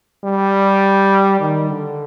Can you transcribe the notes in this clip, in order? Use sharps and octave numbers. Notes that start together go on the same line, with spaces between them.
G3
D#3
D3